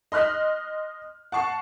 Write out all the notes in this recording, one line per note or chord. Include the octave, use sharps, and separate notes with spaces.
D#5 C6 F6 F#6 B6
F#5 A5 C#6 C7